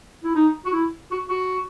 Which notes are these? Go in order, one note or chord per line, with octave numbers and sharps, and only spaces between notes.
E4
D#4
F#4
E4
F#4
F#4